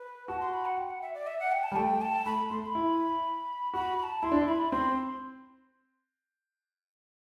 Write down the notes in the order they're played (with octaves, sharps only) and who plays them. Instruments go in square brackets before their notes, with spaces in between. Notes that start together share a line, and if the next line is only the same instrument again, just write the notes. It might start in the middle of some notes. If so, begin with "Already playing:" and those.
Already playing: [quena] B4
[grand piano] F#4 [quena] A5
[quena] C6
B5
F#5
G5
F#5
E5
D5
E5
F#5
G5
A5
[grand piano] G3
[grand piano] A3 [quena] G5
[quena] A5
[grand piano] A3 [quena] B5
[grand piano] A3 [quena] C6
[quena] C6
B5
[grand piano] E4
[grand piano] F#4 [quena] B5
[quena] B5
A5
[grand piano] E4 [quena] C6
[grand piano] D4
E4
[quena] B5
[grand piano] C4 [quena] C6